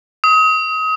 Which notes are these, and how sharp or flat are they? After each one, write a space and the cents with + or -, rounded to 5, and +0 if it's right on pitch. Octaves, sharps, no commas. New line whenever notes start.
D#6 +30